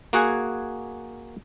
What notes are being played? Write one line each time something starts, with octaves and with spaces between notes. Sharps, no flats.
A#3 F#4 G#4 F#5 G#5